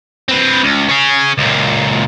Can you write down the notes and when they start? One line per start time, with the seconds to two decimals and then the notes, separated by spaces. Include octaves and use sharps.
0.28 C4 B4
0.63 C#2
0.89 C#4 G#4
1.38 C#2 A#2